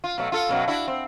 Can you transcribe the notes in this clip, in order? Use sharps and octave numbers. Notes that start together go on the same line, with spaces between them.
F4
B2 F#3 A3
F4 A4
F#2 B2 F#3
D4 E4 F#4
C4